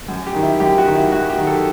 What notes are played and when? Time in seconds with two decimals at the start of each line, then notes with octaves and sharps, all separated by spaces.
0.08 F#2
0.27 G4
0.34 D#3
0.43 E4
0.60 F#2 G4
0.78 F#4
0.86 D#3
0.95 E4
1.12 F#2 F#4
1.29 G4
1.38 D#3
1.47 A4